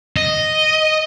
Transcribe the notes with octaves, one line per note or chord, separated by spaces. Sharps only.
D#5